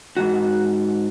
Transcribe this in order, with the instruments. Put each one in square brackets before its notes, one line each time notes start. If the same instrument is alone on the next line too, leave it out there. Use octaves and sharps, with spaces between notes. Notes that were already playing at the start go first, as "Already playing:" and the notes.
[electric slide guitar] G#2 D#3 F#4